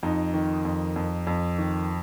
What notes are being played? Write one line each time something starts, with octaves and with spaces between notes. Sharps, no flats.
F2 D#4
D#3
F2
F2
F2
D#3